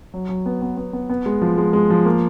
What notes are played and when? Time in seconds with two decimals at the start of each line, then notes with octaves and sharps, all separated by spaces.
0.14 F#3
0.29 F#3
0.46 B3
0.62 B3
0.77 B3
0.93 B3
1.10 B3
1.26 G#3
1.41 F3
1.58 G#3
1.73 G#3
1.90 F3
2.05 A#3